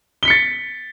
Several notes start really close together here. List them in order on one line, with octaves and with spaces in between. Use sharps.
G7 B6 C#7 A6